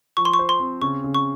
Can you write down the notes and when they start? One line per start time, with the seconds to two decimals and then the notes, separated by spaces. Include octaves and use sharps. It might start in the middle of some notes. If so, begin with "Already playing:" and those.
0.17 F3 C#6
0.25 C6
0.34 C#6
0.39 C5
0.49 C6
0.60 C4
0.82 C#3 C#6
1.04 C#3
1.14 C#6